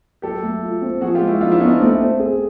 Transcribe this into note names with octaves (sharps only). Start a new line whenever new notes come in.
F#3 G4 A4
A3
F4
C4
F3 F#4 G#4
F4 G4
G#3
E4 F#4
F3 D#4 F4
D4 E4
B3 C#4 D#4
C4 D4
A3
C4
G#4